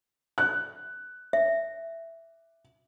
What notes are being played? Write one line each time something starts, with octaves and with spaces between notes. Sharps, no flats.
F#6
E5